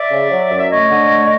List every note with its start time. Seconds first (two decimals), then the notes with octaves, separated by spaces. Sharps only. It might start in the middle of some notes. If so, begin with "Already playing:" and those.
Already playing: D5 E5
0.11 C#3
0.30 F#3
0.50 F#2
0.59 E5
0.70 A3 C#5 D#5
0.89 D3
1.10 A3